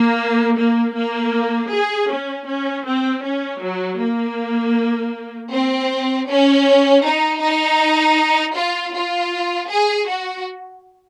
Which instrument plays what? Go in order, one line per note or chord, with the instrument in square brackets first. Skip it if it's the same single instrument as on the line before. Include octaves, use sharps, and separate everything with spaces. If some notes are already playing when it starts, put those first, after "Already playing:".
Already playing: [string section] A#3
A#3
A#3
G#4
C#4
C#4
C4
C#4
F#3
A#3
C4
C#4
D#4
D#4
F4
F4
G#4
F#4